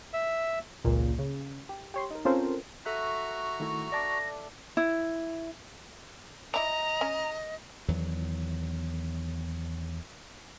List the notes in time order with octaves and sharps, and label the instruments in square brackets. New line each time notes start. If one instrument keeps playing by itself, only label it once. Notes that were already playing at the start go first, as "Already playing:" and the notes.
[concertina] E5
[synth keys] G#1 C#2 A#2
C#3
G4
G4 C#5 C6
D#4 A#4
C4 C#4 F4 A4 A#4 C5
[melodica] F#4 A#5 C#6 [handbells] A4 E5 F#6
[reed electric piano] D#3 A3 E4
[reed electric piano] D5 A5 D6 [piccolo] A#6
[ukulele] E4
[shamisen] E4 D5 [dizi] D#5 [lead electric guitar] A#5
[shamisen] C#4
[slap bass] E2 D#3 F#3